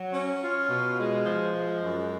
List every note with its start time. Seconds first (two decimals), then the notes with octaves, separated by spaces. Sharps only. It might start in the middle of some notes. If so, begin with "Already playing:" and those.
Already playing: F#3
0.14 C#4
0.41 F4
0.70 B2
0.98 G#3
1.26 F3
1.53 G#3
1.82 F#2